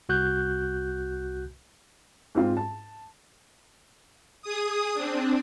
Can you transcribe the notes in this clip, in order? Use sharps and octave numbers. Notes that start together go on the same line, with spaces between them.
C2 F#4 F#6 G6
G#2 C4 F4
A5
G#4 D#6
C4 D4